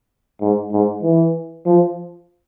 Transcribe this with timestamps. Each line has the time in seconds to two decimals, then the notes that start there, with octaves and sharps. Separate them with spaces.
0.41 G#2
0.72 G#2
1.03 E3
1.66 F3